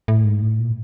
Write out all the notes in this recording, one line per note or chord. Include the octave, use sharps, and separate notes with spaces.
A2
G#2
A2
A#2